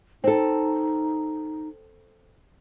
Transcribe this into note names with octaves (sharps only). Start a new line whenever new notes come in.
C4 D#4 A4